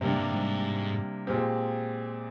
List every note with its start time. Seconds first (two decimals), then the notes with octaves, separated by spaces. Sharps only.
0.01 G#2 C3 G3 A#3 D4
0.16 G2
0.32 G#2
1.27 A#2 G#3 C4 G4